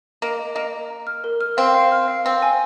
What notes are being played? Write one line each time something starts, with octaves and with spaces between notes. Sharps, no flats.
A#3 D#5
D#5
A#3 D#5
D#5
A#5
F6
A#4
F6
C4 F5
F5
F6
F5
C4 F5
G#5